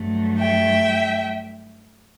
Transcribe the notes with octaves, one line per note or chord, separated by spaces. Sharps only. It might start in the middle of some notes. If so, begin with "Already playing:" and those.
Already playing: G2 F#3 A3
E5 G5